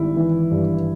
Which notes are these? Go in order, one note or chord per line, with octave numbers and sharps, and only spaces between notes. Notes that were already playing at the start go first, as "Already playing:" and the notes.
Already playing: G#1 G3 E4
E3
G2